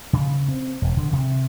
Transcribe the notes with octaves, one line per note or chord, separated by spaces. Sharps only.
C#3
C4
E1
D3
C3